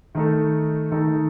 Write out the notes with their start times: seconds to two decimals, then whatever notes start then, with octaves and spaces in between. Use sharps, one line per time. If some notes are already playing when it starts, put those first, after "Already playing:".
0.15 D#3 A3 D#4 A4
0.92 D#3 A3 D#4 A4